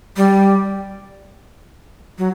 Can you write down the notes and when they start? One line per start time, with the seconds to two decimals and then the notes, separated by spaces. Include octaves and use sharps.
0.17 G3
2.18 F#3